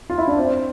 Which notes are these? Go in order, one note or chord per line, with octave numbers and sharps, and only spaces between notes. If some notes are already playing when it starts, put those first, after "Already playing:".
F4
E4
D4
C4